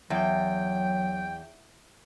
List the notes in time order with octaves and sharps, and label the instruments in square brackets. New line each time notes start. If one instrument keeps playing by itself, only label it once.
[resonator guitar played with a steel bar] E2 [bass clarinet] F#3 [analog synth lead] G5